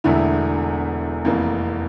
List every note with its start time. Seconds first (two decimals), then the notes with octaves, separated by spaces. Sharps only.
0.04 E1 E2 D3 A3 E4
1.25 F1 F2 E3 A#3